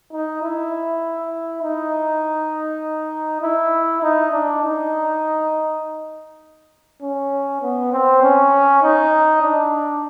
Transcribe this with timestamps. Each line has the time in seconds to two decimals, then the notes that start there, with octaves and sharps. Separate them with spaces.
0.12 D#4
0.42 E4
1.62 D#4
3.42 E4
4.02 D#4
4.32 D4
4.62 D#4
7.02 C#4
7.62 B3
7.92 C4
8.22 C#4
8.83 D#4
9.42 D4